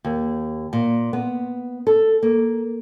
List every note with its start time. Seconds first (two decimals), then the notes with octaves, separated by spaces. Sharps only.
0.05 D#2
0.73 A#2
1.13 B3
1.87 A4
2.23 A#3